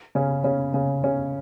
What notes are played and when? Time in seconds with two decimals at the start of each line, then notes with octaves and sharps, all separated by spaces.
0.15 C#3 C#4
0.44 C#3 C#4
0.74 C#3 C#4
1.04 C#3 C#4